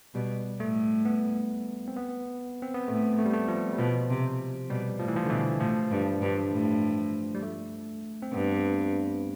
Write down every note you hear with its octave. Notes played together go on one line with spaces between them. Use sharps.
B2 G3
A2 A3
B3
C4
B3
C4
B3
A2 A3
A3
G3
A3
F3
G3
B2 F3
C3
B2 G3
A2 F3
E3
F3
D3
B2 E3
A2 F3
G2
G2
A2
G3
A3
C4
G2 B3